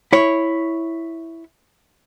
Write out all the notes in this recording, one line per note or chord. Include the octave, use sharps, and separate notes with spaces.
E4 C#5